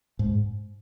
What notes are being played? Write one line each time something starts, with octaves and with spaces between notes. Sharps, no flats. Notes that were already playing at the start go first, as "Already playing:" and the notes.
G#2